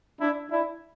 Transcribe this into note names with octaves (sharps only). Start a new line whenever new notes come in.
D4 E4
D4 E4